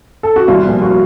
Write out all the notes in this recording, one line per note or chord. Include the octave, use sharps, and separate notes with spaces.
A4
F#4
C2 F4
A#2 F3
F#4